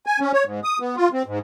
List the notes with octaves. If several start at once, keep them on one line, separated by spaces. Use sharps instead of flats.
G#5
C#4
C#5
G#2
D#6
B3
F4
C4
G#2